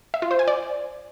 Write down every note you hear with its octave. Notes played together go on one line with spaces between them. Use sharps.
E5
F4
C5
G#5
D5